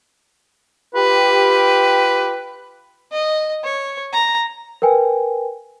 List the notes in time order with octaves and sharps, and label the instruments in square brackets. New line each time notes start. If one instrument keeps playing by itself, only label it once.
[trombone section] F4 G4 [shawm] B4
[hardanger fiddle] D#5
C#5
A#5
[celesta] A#4 B4 G5 G#5